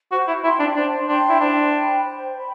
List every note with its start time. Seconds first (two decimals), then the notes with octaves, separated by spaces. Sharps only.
0.12 F#4 C5
0.28 E4
0.43 E4 G5 C6
0.60 D4
0.76 D4 C5
1.08 D4 G5 C6
1.29 E4
1.39 D4 C5
1.73 G5 B5
2.04 C5
2.36 G5 B5